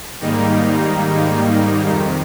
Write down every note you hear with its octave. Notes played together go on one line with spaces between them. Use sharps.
G#2 D#3 G3 A#3 D#4
F2 C3 D#3